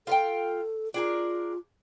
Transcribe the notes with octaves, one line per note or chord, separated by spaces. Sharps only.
F4 A4 F5 G5
D4 F4 G#4 A#4